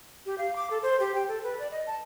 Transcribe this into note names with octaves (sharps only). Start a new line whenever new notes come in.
G4
F5
D6
A4
C5
G4
G5
A4
B4
D5
D#5
A5